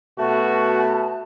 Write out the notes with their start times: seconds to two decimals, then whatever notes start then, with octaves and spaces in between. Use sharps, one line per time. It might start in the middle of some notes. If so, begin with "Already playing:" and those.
0.19 B2 A3 F#4 A5